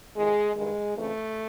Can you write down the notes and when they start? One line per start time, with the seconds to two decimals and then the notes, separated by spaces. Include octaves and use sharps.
0.15 F2 C3 D#3 G#3
0.55 G2 D#3 G#3
0.95 F2 C#3 E3 A3